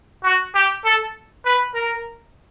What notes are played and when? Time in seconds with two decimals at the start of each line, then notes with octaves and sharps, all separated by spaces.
0.24 F#4
0.55 G4
0.85 A4
1.45 B4
1.75 A#4